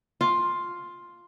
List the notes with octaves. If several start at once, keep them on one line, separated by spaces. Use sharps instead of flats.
F4